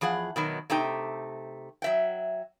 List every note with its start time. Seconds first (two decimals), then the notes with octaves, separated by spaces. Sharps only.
0.01 E2 F3 G#4 F#5
0.36 B2 D#3 F#3
0.70 C3 A3 D#4 G5
1.82 F#3 E5 G5